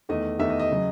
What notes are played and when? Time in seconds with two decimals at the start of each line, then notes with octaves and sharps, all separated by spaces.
0.09 E2 D#3 A3 D#5
0.39 E2 D#3 A3 E5
0.50 D#5
0.60 D#5
0.72 C#3 F#3